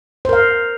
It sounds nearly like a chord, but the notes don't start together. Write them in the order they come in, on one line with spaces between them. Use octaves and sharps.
C5 A#4 F5